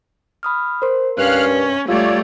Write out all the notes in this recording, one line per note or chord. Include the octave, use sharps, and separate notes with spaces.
B5 D#6 F6
A#4 C5 C6
G2 C#4 F5 F6 F#6
C3
G3 A3 F4 C#5 D5 E6